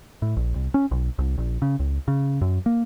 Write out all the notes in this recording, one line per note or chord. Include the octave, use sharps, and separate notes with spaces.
A2
A#1
C2
C#4
B1
C2
A#1
C#3
C#2
C#3
F#2
A#3